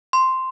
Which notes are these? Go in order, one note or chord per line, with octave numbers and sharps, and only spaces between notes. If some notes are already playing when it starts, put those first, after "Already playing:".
C6